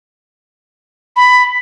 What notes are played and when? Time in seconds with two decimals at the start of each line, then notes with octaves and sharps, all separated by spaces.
1.16 B5